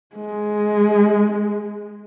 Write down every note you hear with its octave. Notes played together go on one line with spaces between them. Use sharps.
G#3